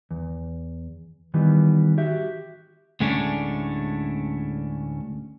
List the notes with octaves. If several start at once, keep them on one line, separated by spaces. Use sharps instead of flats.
E2
D#3 E3 G3 B3
F#4 G4 E5
D2 A2 G#3 A3 C#4 D4